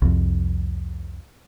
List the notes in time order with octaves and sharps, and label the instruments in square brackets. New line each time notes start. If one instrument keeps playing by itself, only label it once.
[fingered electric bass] C2 F2